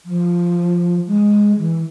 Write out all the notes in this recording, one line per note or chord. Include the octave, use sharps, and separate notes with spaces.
F3
G#3
E3